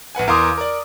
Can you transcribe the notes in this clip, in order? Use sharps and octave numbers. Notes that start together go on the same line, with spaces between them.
A#1 B4 F#5 G#5
E2 A#4 F5 C6 D6 D#6
A#4 D5